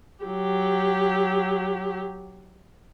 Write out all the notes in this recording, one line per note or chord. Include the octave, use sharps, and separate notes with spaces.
F#3 G4